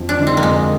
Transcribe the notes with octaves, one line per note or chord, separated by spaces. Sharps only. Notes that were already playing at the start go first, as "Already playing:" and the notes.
Already playing: F2
D4
D3 G#3 D#4
C4
A#3
F2 G#3